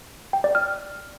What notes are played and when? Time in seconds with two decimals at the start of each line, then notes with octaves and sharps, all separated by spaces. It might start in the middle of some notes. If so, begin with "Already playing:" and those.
0.33 G5
0.44 D5
0.55 F6